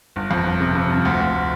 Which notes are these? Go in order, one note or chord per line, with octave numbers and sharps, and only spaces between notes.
G1
F2
G1
C3
C3
G1
D2
D2